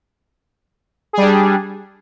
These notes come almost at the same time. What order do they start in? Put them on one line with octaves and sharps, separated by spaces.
G#4 G3 D4